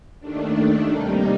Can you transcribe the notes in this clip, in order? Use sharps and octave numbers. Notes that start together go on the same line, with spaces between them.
D#2 D#3 A3 D4
C3 G3 A#3 D#4